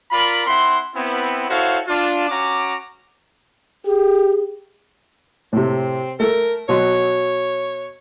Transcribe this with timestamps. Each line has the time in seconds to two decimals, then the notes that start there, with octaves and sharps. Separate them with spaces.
0.12 F4 A#4 D5 B5
0.46 C4 E4 F#5 C6
0.95 B3 C4 E4
1.49 E4 F#4 A4 C5 C#5 F5
1.88 D4 F4
2.29 C#4 F#4 A#5 D6
3.85 G4 G#4
5.53 A2 C3 C4
6.20 A3 A4 A#4
6.69 B2 F#3 C#5 C6